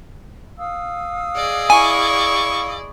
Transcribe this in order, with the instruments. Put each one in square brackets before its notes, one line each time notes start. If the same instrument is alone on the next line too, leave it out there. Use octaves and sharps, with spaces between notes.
[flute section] F5 D#6 E6
[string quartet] G#4 D5 D#5
[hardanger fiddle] E4 C#6 [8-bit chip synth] G#5